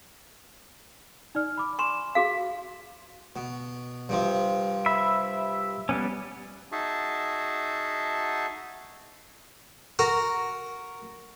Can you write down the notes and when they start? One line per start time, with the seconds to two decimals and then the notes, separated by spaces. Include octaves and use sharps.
1.35 D#4 D5 F6
1.57 B5 D6
1.79 G#5 C6 C#6 E7
2.15 F#4 G#4 F5
3.36 B2
4.09 G2 C3 F3
4.86 E5 B5
5.89 G3 B3 C#4
6.72 D#4 F#4 G#4 E5 A5
9.99 F#4 A#4